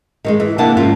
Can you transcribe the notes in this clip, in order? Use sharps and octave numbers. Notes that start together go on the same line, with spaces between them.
D#3 F#3 G#3
E3
C3 A#3 D4 E4 F#5 A5
G#2 D#3 F3 C#4 F4